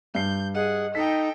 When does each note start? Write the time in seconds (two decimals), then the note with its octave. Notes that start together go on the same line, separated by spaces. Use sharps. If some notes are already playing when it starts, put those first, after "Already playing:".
0.15 G2 G6 C7
0.55 G#4 D#5 F#5
0.95 D#4 A4 G5 B6